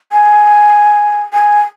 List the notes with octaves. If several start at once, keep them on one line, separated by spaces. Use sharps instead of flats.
G#5
G#5